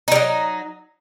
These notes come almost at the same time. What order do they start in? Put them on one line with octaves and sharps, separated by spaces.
D#4 G3 F#3